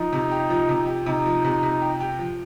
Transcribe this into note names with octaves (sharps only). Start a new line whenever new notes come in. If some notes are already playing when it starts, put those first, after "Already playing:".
Already playing: F3 D#4
C3
G4
F3
C3
G4
C3 D#4
F3
C3
C3
G4
G4
F3